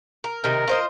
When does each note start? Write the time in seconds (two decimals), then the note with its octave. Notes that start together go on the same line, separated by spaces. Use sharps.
0.24 A#4
0.44 C3 D#3 A#4
0.67 F4 C5 D#5